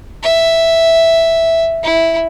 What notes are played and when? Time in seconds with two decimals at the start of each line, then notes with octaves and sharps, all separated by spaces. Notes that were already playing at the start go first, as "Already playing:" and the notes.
0.23 E5
1.83 E4